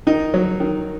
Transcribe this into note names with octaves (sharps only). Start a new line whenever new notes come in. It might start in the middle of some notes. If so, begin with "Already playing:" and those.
D#3 D#4
F#3
D#3